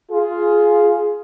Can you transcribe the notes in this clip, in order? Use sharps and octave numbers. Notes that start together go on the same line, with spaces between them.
F4 G#4